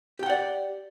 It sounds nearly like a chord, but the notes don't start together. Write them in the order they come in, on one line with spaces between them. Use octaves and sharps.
G4 G5 F#5 D5